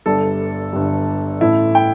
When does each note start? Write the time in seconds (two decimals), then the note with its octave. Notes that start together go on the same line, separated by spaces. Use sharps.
0.06 G1 G2 G3 A4
0.73 G1 G2 G3
1.41 A1 A2 A3 E4
1.75 G5